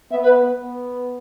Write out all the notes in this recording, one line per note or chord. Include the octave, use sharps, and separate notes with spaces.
B3 E5
B4
B3